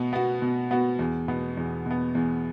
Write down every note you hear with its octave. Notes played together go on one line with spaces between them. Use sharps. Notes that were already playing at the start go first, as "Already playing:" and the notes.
Already playing: B2 B3
B3 F#4
B2
B3 F#4
E2
B2 B3
E2
B2 B3
E2